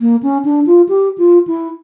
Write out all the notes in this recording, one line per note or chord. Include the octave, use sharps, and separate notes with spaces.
A#3
C#4
D4
F4
G4
F4
E4